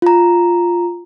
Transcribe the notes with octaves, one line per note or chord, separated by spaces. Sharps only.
F4 A#5